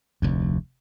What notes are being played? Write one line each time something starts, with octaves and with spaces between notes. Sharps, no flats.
F1 D2